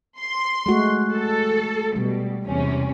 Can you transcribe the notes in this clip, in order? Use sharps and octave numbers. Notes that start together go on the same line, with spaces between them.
C6
G#3 A3 F#4
A4
B2 G3
E2 C3 C#4